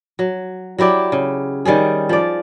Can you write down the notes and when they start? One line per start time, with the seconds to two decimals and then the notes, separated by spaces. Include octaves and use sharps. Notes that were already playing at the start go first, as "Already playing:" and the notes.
0.19 F#3
0.78 F#3 E4 G4 D5
1.12 C#3
1.65 D#3 G3 C#4 G#4
2.09 F3 D5